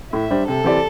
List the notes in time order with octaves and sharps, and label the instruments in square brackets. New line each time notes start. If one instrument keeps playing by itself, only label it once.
[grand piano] A2 [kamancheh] E5
[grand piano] G3 D4 C5
[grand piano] C3 [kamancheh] A4
[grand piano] E3 C4 G4 D5